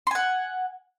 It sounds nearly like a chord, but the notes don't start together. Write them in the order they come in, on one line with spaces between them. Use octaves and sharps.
C6 G#5 F#5